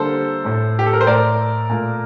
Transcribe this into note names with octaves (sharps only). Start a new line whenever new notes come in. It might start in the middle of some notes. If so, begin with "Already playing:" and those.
Already playing: D3 G3 A#3 A4 C5
A2 A3
G4
A4
A#4
C5
A2 A3 A#4 D5
A#2 A3